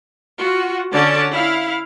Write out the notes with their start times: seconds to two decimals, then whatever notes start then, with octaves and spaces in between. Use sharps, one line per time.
0.39 F4 F#4
0.92 D3 C#4 D5 A5
1.32 E4 F5